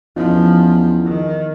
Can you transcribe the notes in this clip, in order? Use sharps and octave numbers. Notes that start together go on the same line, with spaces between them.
E2 F3 C#4 D#4 F4
D#3